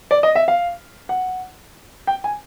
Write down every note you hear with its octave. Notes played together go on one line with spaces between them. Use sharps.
D5
D#5
E5
F5
F#5
G5
G#5